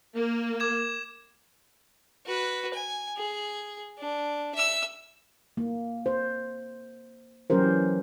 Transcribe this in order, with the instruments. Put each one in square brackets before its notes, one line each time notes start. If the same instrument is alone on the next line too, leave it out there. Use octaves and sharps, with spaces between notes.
[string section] A#3
[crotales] D6 G#6 E7
[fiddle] F#4 B4
G#5
G#4
D4
E5 E6
[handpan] A#3
C5
E3 F#3 C#4 G4 A#4 C5